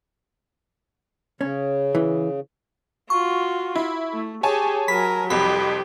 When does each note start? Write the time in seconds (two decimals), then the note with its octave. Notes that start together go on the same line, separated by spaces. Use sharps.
1.41 C#3 C#4
1.95 E3
3.10 F4 F#4 C#6
3.76 E4
4.13 A3
4.43 G4 G#4 C#5 G#5 A5
4.88 F#3 A#4 B5 B6
5.30 C2 F2 G4 B5